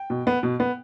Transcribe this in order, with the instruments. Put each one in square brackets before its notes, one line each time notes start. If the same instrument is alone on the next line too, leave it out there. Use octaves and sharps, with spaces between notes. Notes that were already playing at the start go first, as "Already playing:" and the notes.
Already playing: [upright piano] G5
B2
B3
B2
B3